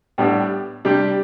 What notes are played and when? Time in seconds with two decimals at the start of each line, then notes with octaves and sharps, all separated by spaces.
0.18 A2 G3 B3 D4
0.85 C3 G3 D4 G4